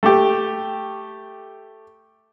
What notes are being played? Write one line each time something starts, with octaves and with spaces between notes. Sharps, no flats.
A3 G4